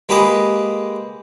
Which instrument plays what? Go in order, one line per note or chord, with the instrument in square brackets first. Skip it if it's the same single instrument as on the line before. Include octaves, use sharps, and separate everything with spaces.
[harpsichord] G#3 A#3 G4 B4 D#6